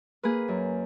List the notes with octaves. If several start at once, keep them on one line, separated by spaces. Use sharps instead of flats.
A#3 G#4 B4
F#2